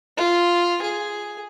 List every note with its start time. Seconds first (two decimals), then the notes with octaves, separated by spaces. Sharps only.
0.17 F4
0.82 G#4